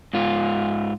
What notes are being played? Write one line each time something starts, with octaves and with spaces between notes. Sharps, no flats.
G#2 F4